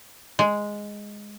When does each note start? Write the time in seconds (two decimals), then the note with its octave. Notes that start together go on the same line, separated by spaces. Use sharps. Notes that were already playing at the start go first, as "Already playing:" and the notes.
0.39 G#3